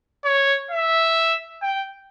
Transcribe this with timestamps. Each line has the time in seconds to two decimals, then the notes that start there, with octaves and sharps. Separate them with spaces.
0.25 C#5
0.71 E5
1.62 G5